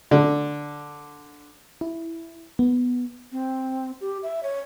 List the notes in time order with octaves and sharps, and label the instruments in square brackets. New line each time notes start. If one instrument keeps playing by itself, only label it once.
[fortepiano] D3
[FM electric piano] E4
B3
[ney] C4
G4
E5
C#5